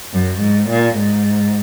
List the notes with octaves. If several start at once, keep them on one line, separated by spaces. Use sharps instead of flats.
F#2
G#2
A#2
G#2